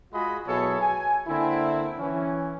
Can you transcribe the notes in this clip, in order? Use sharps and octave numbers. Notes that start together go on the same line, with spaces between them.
G#3 F4 F#4 G#4 D#5 B5
B2 F#3 E4 G#4 A4 C#5
G#5
D3 A#3 C4 E4
E3 C#4